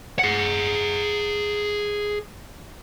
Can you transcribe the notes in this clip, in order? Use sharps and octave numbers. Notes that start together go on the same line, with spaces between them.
G#4 F#5